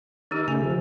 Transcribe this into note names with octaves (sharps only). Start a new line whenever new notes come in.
D#3 D#4 G4 A#4
C#3 A3 G#5
F3